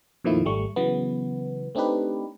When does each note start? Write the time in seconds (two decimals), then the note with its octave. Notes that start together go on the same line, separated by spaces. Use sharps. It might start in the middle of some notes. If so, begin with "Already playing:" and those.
0.24 F2 A#2 D#3 F3 A3 E4
0.45 G#1 G3 A3 C#6
0.76 C#3 E3 F#3 B3
1.75 A3 C4 D4 D#4 G4 B4